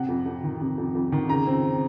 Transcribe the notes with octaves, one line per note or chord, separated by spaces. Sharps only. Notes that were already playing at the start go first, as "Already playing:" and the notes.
Already playing: C3 F#5
F2
F2
D#3
C3
F2
F2
D#3
C#3 A#5
C4